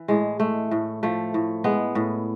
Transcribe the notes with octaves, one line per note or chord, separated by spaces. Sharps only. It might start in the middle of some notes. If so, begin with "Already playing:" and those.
Already playing: E3
A2 G#3
G#3 A3
A2
F3 A3
A2
G#3 B3
A2